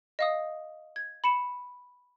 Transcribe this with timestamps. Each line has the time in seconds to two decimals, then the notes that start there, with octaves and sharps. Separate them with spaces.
0.19 D#5 F5 D#6
0.96 G#6
1.24 B5 C#7 E7